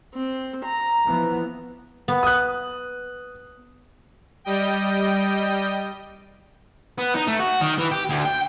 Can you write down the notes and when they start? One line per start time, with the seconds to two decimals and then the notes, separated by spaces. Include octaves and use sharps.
0.14 C4
0.64 A#5
1.05 E3 F3 B3
2.08 B3
2.23 D#6 F#6
4.44 G3 D#5 G5
6.98 B3
7.15 D#4
7.27 A3
7.39 F#4
7.61 D#3
7.79 E3
7.92 G4
8.10 D2
8.25 G5